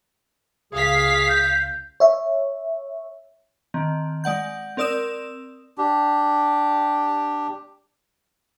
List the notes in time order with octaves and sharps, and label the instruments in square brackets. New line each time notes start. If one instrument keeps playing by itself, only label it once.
[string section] C#2 F5 B6 [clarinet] G#4
[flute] G6
[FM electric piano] C#5 E5
[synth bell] D#3 C4
G#3 D5 F#5 G6
C4 A#4 D5 D#6 E6 E7
[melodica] D4 G4